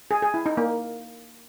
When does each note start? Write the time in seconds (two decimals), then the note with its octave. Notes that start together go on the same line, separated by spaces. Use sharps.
0.11 G#4
0.22 G#4
0.34 E4
0.46 D#4
0.57 A#3